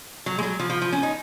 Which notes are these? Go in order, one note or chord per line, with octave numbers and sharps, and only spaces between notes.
F#3
G#3
F#3
F3
F3
F3
C#4
D#4